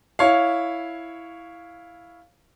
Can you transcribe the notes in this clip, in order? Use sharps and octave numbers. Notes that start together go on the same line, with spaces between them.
E4 C#5 F5